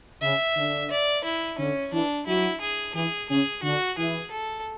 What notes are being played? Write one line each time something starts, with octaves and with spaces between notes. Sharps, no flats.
C#3 C#4 E5
D3 D4
D5
E4
D3 C#4 D4
E3 D4 E4
F#3 E4 F#4
G#4
E3 E4 G#4
C#3 C#4 G#4
D3 D4 F#4
E3 E4 G#4
A4